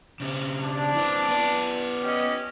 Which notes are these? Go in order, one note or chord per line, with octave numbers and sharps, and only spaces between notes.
C#3 C4
D4
E3 C4
B3 D5
C#4 G4 D#5